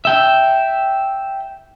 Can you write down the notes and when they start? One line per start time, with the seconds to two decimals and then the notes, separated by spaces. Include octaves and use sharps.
0.05 E5 G5